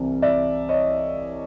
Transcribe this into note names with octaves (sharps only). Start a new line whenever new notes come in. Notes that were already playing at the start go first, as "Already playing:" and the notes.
Already playing: C2 C3 E3
D5 E5
C#5 D#5